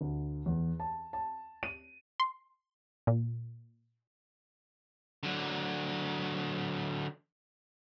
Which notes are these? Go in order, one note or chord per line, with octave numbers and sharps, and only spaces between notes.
D2
E2
A5
A5
D#7
C6
A#2
D3 F#3